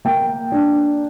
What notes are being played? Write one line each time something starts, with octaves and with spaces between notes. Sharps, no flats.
A#3 G5
D4